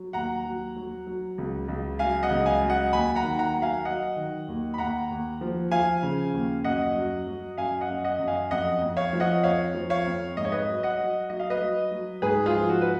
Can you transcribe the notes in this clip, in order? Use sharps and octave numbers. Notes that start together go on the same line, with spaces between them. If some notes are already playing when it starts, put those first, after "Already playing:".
Already playing: F#3
D#2 F#5 A#5
F#3
F#3
F#3
C#2
C#2
F#3 F5 G#5
D#5 F#5
C#2
F5 G#5
F#3
D#5 F#5
D#2 G#5 B5
F#5 A#5
D#3
F#5 A#5
F#3
F5 G#5
F#3 D#5 F#5
D#3
D#2
B5
D#2 F#5 A#5
D#2
F3
F3 F5 G#5
C#3
D#2
F#2 D#5 F#5
F#3
F#3
F#2 F5 G#5
D#5 F#5
F#2
D#5 F#5
F#2
F5 G#5
F2 D#5 F#5
F2
C#5 F5
F3
D#5 F#5
F2 C#5 F5
F3
C#5 F5
F2
G#2 D#5
C#5
B4 D#5
F#3
D#5 F#5
F#3
F#3 D#5
F5
B4 D#5
F#3
F#3
G#2 G#4 B4
F4 G#4
F3
F#4
B4